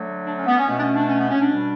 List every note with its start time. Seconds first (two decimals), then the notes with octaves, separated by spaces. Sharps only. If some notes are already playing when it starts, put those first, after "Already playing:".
Already playing: D3 F#3 A3
0.26 D4
0.36 C#4
0.46 B3
0.57 C#4
0.67 B2 A3 B3
0.77 D4
0.81 C#4
0.95 D4
1.09 C#4
1.20 B3
1.30 C#4
1.40 D4
1.50 B2 G3